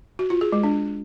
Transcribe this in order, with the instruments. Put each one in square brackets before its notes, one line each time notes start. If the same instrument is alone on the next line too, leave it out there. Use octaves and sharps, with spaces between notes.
[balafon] F#4
F4
G#4
G#3
D4